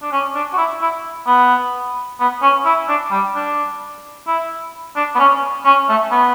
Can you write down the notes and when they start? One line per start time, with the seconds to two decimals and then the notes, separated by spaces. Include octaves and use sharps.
0.02 D4
0.12 C#4
0.35 D4
0.53 F#4
0.57 E4
0.82 E4
1.27 B3
2.20 B3
2.42 C#4
2.65 E4
2.88 D4
3.11 G3
3.35 D4
4.27 E4
4.96 D4
5.15 B3
5.19 C#4
5.65 C#4
5.89 A3
6.11 B3